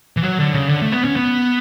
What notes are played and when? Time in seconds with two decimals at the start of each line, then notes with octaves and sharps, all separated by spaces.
0.17 E3
0.23 F#3
0.39 D3
0.54 C#3
0.69 D3
0.82 A3
0.92 B3
1.04 C#4
1.16 B3